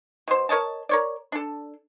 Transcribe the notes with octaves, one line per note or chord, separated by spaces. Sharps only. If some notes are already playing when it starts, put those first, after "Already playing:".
B2 C5
A#4 C#5 D#5 A5
A#4 C#5 D5
D4 A4